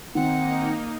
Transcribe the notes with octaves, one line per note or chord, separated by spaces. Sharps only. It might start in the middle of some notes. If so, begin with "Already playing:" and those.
D#3 A#3 C4 D#4 F#5